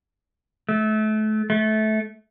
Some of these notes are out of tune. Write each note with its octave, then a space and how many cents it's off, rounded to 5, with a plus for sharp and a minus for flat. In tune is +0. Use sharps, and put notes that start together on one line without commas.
A3 -30
A3 -20